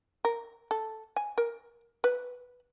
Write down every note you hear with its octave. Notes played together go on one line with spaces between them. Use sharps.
A#4
A4
G#5
A#4
B4